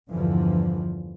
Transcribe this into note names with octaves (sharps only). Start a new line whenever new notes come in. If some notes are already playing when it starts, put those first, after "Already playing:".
E2 G2 D3 E3 F3